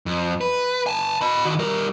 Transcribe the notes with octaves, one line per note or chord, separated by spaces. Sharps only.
F2
B4
G#5 A5
D#5 B5
D#3 F#4
G3 A#4